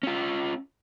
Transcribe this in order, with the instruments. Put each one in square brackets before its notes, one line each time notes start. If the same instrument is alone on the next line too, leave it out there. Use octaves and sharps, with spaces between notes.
[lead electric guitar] C#4 F4